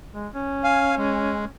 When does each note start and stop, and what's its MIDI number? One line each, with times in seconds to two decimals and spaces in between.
0.15 0.28 56
0.35 1.50 61
0.64 0.95 77
0.64 0.95 80
0.98 1.45 56